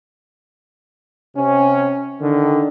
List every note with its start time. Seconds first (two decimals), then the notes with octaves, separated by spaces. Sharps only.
1.36 C3 C#4
2.21 D3 D#3